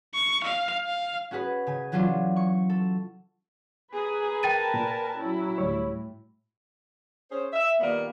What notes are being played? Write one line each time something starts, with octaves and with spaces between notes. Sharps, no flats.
C#6
F5
F5
C#4 F#4 G#4 B4
C#3 G#5
E3 F#3 C#4 D4 F4
C#6
A4
G#4 B4 G#5 A#5
A#4 G5 A5 A6 D#7
A#2
F#3 C#4 E4
D2 A2 G3 C#5
C#4 G#4 C5
E5
A#2 D#3 G3 A#3 B3